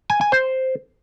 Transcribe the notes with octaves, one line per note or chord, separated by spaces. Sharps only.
G#5
G#5
C5